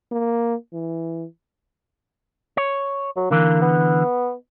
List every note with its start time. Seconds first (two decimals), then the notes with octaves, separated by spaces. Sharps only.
0.11 A#3
0.73 E3
2.57 C#5
3.17 F#3
3.31 D3 E3 A#3
3.62 B3